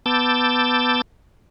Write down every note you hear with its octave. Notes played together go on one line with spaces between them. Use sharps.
B3 A5 D6 E6 G6 A6